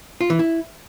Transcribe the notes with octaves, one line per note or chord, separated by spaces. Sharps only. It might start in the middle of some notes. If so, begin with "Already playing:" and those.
F4
E3
E4